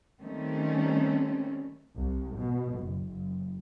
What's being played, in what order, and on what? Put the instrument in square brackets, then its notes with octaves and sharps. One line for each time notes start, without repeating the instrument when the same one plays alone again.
[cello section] D#3 G3 A3 C4 C#4
[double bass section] C2
B2
F#1
F#1